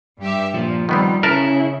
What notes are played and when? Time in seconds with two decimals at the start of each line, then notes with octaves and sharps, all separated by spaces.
0.19 G2 G4 E5
0.54 A#2 F3
0.89 D#3 G3 B3 C4
1.23 C#3 E4 A#4 B4 A5